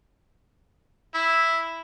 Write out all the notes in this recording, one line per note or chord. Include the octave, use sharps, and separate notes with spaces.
E4